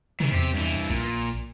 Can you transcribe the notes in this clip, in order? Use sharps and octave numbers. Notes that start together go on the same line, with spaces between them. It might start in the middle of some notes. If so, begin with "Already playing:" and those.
C3 D#3 E3
E2 C3 G4
G2 E3
A#1 A#2